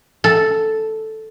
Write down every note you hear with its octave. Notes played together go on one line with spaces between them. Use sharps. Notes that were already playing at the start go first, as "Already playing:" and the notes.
A4